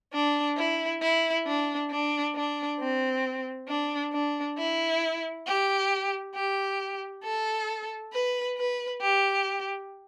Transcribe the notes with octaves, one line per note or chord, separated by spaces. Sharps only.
D4
E4
E4
D4
D4
D4
C4
D4
D4
E4
G4
G4
A4
B4
B4
G4